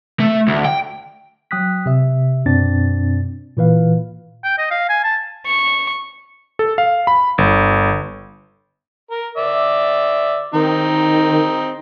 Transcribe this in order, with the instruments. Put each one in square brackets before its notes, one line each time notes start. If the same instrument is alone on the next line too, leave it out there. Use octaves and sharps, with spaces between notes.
[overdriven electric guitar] A3
D2
G5
[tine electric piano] F#3 G5 D#6 F#6 B6
C3 E5
F#2 B2 C4 D4 A6
A#2 E3 B4 F5
[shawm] G5
D#5
F5
G#5
A5
[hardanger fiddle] C#6
[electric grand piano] A4
F5
B5
G1
[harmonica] A#4
D5 E5
[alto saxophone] D#3 [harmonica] C4 D#4